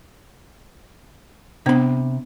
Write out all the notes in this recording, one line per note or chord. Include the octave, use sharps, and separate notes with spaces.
C3 B3 D4 B5